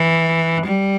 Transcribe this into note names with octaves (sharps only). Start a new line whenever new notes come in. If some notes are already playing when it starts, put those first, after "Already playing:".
Already playing: E3
G3